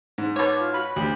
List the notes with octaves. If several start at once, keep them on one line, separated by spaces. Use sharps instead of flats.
G#2
B2 C#5 D6
F4
F#4 B5
D2 G4